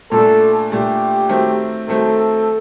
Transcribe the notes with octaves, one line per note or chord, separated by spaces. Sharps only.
A#2 A3 D4 A4
A#2 A3 D4 G4
D#3 F#3 A3 C4
D#3 F#3 A3 C4 A4